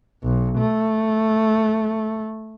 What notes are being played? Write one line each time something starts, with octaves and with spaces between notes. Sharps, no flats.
B1
A3